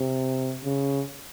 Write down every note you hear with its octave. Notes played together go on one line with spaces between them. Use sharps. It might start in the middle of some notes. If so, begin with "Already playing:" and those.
Already playing: C3
C#3